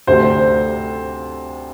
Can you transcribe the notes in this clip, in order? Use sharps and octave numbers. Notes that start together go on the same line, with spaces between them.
D2 C3 A3 C5